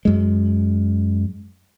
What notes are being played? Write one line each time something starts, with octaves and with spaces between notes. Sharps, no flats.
F#2 G#3